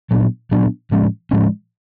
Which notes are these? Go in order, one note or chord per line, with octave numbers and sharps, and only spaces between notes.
A#2 F#3 B3 D4
A#2 F#3 B3 D4
A2 F3 G#3 C#4
A2 F3 G#3 C#4